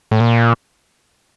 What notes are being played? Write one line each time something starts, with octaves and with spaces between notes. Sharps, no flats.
A2
A#2